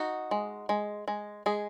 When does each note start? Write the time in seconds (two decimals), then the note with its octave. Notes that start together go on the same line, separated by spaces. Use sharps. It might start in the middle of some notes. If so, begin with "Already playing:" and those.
Already playing: D#4 F#4
0.31 G#3
0.69 G#3
1.08 G#3
1.46 G#3 G#4